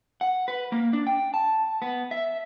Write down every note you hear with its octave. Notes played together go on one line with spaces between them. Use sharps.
F#5
B4
A#3
D4
G5
A5
B3
E5